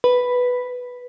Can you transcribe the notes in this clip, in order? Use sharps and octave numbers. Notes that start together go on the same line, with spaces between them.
B4